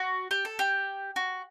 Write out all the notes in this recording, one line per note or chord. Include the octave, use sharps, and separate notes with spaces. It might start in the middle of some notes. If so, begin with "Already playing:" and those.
Already playing: F#4
G4
A4
G4
F#4